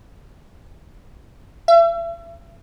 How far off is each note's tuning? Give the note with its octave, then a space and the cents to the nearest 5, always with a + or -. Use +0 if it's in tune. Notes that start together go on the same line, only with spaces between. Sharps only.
E5 +40